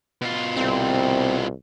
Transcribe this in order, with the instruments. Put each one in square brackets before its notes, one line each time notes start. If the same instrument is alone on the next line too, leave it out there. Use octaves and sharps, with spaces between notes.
[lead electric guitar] B2 F4
[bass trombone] C2 [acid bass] C4